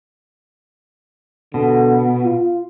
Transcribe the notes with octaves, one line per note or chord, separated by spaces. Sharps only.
B2 D3
F4